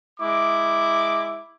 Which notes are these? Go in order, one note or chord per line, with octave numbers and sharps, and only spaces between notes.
G#3 E4 D6